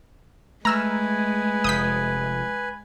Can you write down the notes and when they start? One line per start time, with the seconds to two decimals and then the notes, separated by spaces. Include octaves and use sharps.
0.65 G#3 A3 B4 G#5 A#5 E6 F6
1.64 F1 D#6 G6 B6